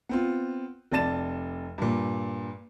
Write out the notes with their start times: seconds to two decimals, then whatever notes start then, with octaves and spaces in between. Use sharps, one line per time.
0.09 B3 C4 F4
0.92 F1 C3 D5 A5 A6 E7
1.78 G2 A#2